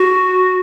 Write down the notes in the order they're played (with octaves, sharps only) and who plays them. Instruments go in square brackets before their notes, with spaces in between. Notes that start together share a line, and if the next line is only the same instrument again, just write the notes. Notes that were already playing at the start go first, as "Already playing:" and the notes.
Already playing: [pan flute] F#4